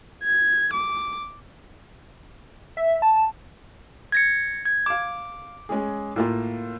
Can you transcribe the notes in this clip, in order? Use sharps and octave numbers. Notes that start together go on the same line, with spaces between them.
G#6
D6
E5
A5
G#6 A#6 C#7
G#6
F5 D6 E7
G#3 C#4 G#4
A2 A#3 F4